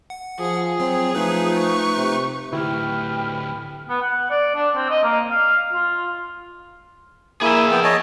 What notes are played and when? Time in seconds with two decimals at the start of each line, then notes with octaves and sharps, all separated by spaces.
0.10 F#5
0.39 F3 G#4
0.80 F#3 C4
1.15 F3 A3 D#4 B4
1.58 C#6
1.97 C3
2.53 D2 A2 E4 G4 B4 G5 F6
3.89 B3
4.02 F#5
4.30 D5
4.55 D4
4.75 C4
4.90 D#5
5.04 A#3
5.30 F5
5.73 F4
7.41 A#3 E4 G#4 E5
7.71 B3 G5
7.84 C#5 D#5 A5